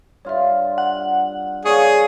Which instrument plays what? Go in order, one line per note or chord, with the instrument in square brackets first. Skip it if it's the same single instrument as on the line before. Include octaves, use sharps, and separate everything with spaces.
[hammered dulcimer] G2 F4 [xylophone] C#5 E5
[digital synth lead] F#5
[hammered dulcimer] A#3 [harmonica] G#4 [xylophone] C#5 D5 [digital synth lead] C#6